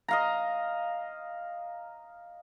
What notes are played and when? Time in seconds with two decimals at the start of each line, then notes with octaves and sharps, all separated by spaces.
0.08 D#5 F5 A#5